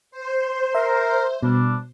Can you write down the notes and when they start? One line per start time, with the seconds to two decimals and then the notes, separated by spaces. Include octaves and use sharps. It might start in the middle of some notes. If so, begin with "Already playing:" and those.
0.11 C5
0.75 A#4 E5
1.43 B2 G3 D4